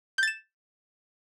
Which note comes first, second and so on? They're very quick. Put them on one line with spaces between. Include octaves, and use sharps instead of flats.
G6 A6 E7